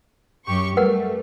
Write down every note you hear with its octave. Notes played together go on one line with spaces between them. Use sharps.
F#2 G4 C#6
G3 A3 A#4 B4 F#5